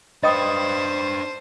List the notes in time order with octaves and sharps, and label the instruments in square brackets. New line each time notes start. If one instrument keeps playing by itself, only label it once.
[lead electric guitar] D4 B4 [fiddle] C5 [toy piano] D#5 G5 D#6